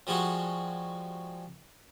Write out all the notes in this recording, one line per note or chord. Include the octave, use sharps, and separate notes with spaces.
F3 G3 G#3 F#4